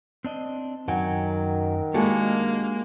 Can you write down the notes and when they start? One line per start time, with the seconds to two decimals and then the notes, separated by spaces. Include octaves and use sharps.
0.24 C4 D4 D#5
0.88 F#2 D#3 F#3 G5 G#5
1.94 G#3 A#3 D4 F#4 G4 A4